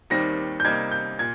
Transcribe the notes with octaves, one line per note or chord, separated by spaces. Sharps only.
D#2 D#3 G3 C4 A#6
G6
C3 G3 A#3 D#4 G#6
G6
A#2 G#6